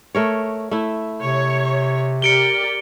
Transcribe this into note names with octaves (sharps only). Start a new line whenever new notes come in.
A3 A#4 C#5
A3 E4
C3 C#5
G4 A#4 D5 C#7 D7 G7